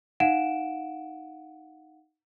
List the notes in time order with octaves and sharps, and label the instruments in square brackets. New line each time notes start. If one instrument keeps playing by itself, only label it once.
[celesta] D#4 F5 F#5 D7 E7